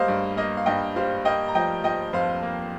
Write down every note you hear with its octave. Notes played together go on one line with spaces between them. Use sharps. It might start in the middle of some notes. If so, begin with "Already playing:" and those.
Already playing: G3 A#3 C5 D#5 F5
G2
A#3 D#5
F5
G2 D#5 G5
G3 C5 F5
A#3 D#5 G5
A#5
F3 D#5 G5
F3 D#5 G5
F2 C5 F5
A#3